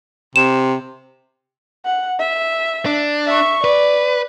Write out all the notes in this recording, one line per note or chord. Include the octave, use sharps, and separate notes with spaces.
C3 E7
F#5
E5
D4
E5 C#6
B4 D5